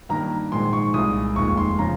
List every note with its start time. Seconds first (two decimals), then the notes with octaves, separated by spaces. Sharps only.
0.09 G2 D#3 A#3 A#5
0.52 A#1 G#2 D#3 G#3 C6
0.73 C#6
0.94 C2 A#2 G#3 D#6
1.36 F1 D#2 D#3 G#3 C#6
1.57 C6
1.79 C#3 F3 A#5